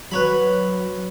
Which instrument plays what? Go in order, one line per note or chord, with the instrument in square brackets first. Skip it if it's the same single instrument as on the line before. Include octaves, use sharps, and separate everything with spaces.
[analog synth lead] F#3 [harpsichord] B4 C#5 B5